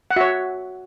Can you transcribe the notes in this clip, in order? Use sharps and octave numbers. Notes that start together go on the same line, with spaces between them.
F#5
F#4 C#5 E5